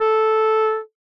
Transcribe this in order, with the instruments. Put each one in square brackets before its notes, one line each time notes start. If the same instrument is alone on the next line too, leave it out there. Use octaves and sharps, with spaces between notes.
[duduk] A4